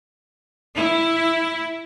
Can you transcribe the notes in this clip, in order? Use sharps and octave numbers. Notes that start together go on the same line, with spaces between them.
E4